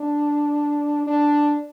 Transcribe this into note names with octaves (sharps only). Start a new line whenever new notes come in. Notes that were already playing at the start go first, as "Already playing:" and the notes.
Already playing: D4
D4